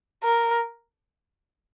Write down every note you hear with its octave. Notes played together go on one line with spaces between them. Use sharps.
A#4